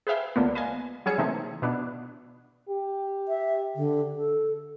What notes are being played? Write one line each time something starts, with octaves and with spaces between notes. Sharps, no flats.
G#4 B4 C5 E5 F5 G5
C#2 D3 A#3 B3
B4 D#5 F5 G#5
F#3 G3 C#4 G#4 E6 C#7
C3 E3 A3 A#3 C4 D#4
B2 B3 D4 E4
G4
E5
D3
A4